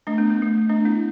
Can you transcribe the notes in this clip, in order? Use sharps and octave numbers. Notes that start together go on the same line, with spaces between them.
A3 D4
B3
B3
A3
A3 D4
B3 E4